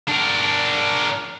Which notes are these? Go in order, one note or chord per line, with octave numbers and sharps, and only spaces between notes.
D4 A#4